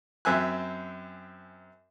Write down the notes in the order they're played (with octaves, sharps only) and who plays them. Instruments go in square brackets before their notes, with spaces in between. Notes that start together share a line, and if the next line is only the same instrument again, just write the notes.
[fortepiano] F#2 C4 E5 G#5 F#6